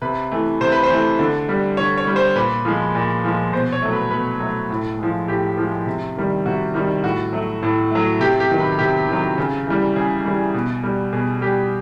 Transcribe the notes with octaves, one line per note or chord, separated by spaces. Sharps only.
C3 B4
E3 A3
C3 C5
B4
C5
E3 A3
D3
G3
D3 C#5
C#5
G3
C5
A#2 B4
F3 G#3
A#2
F3 G#3
B2 C5
C#5
F#3 A3
B4
B2 B4
F#3 A3
A2
F3 G#3
A2 G4
F3 G#3
C3
D#3 G3
C3 F#4
D#3 G3
A2 F#4
F#3 A3
A2
F#3 A3
C3 G4
G4
D#3 F#3
B4
C3 G4
D#3 F#3
C#3
E3 G3
C#3 G#4
E3 G3
B2
G3
B2 G#4
G3 G4